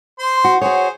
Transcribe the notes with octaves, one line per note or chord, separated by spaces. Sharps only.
C5 C6
F#4
F#4 G#4 C5 C#5